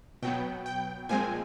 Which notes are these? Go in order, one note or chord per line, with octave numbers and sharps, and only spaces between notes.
B2 F#3 B3 G5
G5
A#2 F3 G#3 C4 G#5